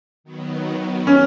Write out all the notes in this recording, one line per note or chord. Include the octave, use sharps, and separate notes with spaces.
D#3 F#3 B3
C#4